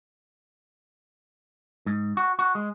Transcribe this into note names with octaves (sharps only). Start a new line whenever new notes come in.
G#2
F#4
F#4
G#3